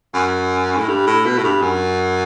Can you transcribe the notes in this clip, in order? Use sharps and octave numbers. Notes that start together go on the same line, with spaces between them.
F#2
A2
G2
A2
B2
A2
G2
F#2